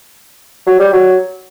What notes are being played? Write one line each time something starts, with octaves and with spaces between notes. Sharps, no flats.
F#3
G3
F#3